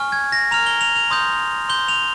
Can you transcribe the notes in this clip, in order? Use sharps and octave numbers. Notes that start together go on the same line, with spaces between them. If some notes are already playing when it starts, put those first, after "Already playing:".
Already playing: G#5 C#6 F6
G#6
A#6
A#5 F6 F7
G7
F7
F7
C6 D#6 G6
C6 G6 G7
F7